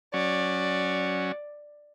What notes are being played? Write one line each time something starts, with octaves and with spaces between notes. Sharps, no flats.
F#3 C#4 D5